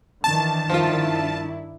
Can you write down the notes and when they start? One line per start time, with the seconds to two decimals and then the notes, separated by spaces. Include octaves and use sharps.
0.24 D#3 E3 D4 A5
0.69 G2 F3 D4 E4 F4